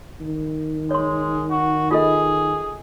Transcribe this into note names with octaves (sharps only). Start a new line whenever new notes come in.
D#3
G#3 C#5 C6
F#4
F4 G#4 A4 D#5